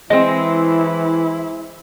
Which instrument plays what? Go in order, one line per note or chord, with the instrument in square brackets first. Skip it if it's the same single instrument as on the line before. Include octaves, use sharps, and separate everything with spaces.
[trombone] E3 [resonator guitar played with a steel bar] G#3 C4 [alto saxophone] E4 [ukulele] D#5